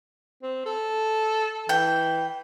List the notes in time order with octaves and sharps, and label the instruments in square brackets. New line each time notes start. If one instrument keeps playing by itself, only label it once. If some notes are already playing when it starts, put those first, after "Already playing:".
[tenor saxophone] C4
A4
[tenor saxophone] E3 [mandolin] G5